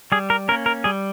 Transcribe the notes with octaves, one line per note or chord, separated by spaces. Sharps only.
G3 G#4
A#4
A#3 C#4 A#4
A#4
G3 G#4